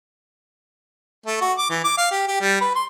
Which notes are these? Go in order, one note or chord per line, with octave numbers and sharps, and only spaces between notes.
A3
F#4
D6
E3
D6
F5
G4
G4
G3
B4
C6